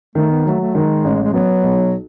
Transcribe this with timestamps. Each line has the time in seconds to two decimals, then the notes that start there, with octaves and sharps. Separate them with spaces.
0.15 D#3 A3
0.30 B3
0.45 F#3 A3
0.60 A3
0.74 D#3 G#3
1.04 A1
1.23 G#3
1.33 F#3 B3
1.63 B1